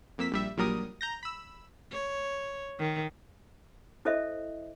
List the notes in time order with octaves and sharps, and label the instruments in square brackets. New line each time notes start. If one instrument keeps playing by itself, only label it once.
[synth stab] F2 A#3 E6 B6
A#1 G3 E5
A#1 A#2 F#3 G3 A#4 D#6
A#5 G6 A#6
B5 E6
[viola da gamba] C#5
D#3
[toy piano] E4 A4 C5 D#5 E5